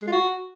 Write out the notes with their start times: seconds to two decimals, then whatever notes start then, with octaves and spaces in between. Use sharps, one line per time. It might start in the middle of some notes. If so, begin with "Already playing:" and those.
0.02 G#3
0.07 F4
0.12 F#4